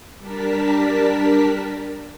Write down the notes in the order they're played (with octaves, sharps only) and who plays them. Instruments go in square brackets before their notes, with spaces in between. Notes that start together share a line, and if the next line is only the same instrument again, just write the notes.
[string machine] G3 D4 A#4 A5 B6